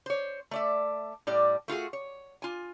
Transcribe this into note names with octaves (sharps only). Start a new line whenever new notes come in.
C5 C#5
A3 D5 E5
A2 G3 D5
A3 F4 F#4 G#4
C#5
F4 G#5